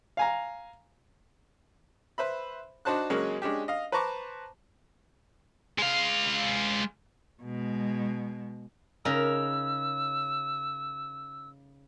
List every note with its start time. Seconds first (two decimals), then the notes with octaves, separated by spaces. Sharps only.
0.17 F5 G#5 A#5
2.18 B4 C5 E5 B5
2.85 D4 D#4 F#4 C5 A5 F#6
3.10 C#3 F#3 G#3 A#3 C#4
3.42 G#3 C#4 D4 G4
3.68 D#5 F5
3.92 B4 C5 A5 A#5 C#6 D6
5.79 G#3 F5
7.43 B2 G#3
9.05 C#3 D#4 A#4 E6